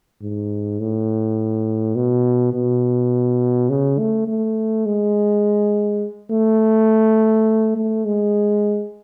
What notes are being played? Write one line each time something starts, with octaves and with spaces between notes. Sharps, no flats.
G#2
A2
B2
B2
C#3
A3
A3
G#3
A3
A3
G#3